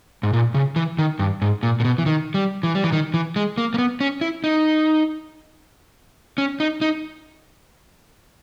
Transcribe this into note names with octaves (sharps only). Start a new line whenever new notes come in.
G#2
A#2
C#3
E3
D#3
G2
G#2
A#2
A#2
B2
E3
D#3
G3
E3
G3
E3
D#3
E3
G#3
A#3
A#3
B3
C#4
E4
D#4
C#4
D#4
D#4